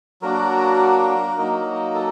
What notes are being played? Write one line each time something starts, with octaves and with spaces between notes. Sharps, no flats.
F#3 A#3 D4 F#4 A#4
F#3 A#3 D#4
A4